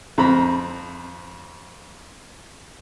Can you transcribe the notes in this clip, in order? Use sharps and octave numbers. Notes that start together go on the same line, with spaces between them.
F2 C4 A#5 B5